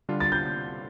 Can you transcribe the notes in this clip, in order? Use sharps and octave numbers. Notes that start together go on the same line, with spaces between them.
D3 G3 D4 F4
A6
G6